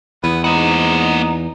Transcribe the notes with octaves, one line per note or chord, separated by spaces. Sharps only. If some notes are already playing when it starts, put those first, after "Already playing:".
E2 B3
G#2 A#3 D#4 F#5